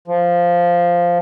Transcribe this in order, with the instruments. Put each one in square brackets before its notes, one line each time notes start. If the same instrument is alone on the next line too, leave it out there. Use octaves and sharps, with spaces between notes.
[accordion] F3